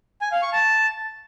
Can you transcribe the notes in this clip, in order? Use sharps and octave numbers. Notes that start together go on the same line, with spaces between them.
G#5
F5
C#6
A5